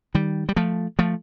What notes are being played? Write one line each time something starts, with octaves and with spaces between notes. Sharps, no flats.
D#3 G3
G3
F3 A3
F3 A3